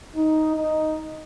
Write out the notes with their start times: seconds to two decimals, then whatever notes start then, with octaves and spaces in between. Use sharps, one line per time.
0.16 D#4
0.55 D#4